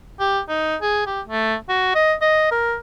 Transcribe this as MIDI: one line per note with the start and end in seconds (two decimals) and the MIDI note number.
0.19 0.40 67
0.48 0.76 63
0.81 1.04 68
1.06 1.21 67
1.28 1.55 57
1.69 1.92 66
1.95 2.14 75
2.21 2.47 75
2.51 2.76 70